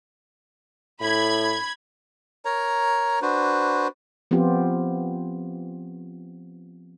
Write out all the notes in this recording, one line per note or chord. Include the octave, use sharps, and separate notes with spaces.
A2 B5 G#6
A#4 C#5 A#5
D4 F#4 B4 C5
F3 B3 C4 F4 G4